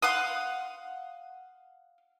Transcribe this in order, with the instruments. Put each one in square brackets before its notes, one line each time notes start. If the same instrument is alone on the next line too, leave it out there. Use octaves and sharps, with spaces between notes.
[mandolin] F5 F#5 C6 D#6